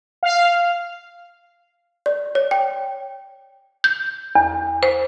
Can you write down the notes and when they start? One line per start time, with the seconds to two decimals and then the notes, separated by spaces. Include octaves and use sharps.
0.23 F5
2.06 D5
2.35 C#5
2.51 G5
3.84 G6
4.35 E2
4.83 C5